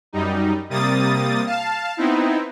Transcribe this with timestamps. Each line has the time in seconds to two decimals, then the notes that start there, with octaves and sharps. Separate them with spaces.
0.13 F#2 G3 D#4
0.69 C3 G3 A#3 D#6 A6
1.46 F5 A5
1.97 B3 C4 D#4 E4